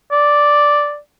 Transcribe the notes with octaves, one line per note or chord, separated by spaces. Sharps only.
D5